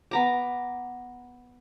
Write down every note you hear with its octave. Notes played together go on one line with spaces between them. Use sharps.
B3 A#5 D6